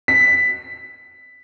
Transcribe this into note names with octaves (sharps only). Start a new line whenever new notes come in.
B6